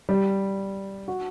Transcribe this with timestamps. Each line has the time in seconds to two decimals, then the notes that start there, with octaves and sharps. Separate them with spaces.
0.09 G3
1.08 F#4